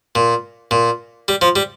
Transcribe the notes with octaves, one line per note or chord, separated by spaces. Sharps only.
A#2
A#2
G3
F3
G3